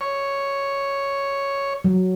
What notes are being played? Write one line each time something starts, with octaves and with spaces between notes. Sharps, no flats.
C#5
F#3